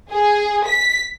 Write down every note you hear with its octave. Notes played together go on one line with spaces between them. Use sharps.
G#4
B6